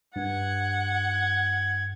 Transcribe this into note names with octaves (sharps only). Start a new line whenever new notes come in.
G2 F#5 G#6